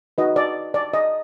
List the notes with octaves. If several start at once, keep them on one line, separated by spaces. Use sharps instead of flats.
D#4 F#4 B4 D#5
D5
D5
D#5